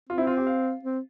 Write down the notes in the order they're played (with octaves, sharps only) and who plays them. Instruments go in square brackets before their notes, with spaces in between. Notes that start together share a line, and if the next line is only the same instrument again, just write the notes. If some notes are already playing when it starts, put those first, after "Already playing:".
[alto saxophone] C4 [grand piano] F4
[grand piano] E4
F4
G4
F5
[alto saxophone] C4